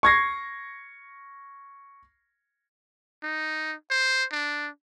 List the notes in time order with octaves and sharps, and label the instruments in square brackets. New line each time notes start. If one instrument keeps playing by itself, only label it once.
[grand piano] C#6 G#6 A#6 C7
[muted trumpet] D#4
C5
D4